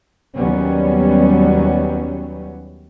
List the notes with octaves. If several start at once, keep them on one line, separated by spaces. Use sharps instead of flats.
D#2 F#3 G3 B3 C#4